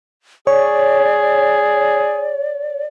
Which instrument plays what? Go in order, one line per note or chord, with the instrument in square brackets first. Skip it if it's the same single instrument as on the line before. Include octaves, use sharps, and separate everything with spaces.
[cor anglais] G#4 [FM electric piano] C#5 [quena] D5